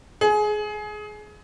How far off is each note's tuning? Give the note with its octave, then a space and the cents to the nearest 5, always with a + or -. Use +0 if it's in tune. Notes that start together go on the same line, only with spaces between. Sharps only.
G#4 +20